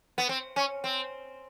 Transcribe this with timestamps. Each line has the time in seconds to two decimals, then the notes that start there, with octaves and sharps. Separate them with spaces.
0.18 B3
0.29 C4
0.56 C#4
0.84 C4